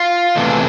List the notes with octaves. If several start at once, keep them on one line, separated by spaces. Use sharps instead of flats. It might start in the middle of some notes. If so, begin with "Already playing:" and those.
Already playing: F4
E2 C3 E3 A3 D4